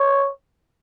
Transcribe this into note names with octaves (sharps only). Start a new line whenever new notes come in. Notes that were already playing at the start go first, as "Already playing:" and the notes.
Already playing: C#5